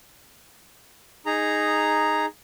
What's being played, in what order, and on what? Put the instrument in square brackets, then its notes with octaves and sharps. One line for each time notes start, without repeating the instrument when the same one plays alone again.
[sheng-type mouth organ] D#4 G#4 A#5